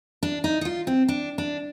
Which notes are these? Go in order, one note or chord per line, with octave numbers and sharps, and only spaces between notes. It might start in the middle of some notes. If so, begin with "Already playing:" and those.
D4
D#4
D#4
F4
C4
D4
D4